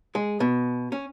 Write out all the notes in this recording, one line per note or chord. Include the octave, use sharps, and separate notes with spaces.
G#3
B2
C#4